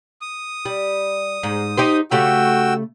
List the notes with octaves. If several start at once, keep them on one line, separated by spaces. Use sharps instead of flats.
D#6
G3
G#2
D#4 G4 C5
C#3 A3 F#4 G4 G5 E6